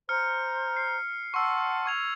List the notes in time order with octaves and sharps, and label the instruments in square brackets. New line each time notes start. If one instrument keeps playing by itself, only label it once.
[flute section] C5 A#5 [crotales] F6 C#7
[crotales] C7
[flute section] F#5 A5 C6 [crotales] C#6 E6
[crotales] C#6 G#6 F7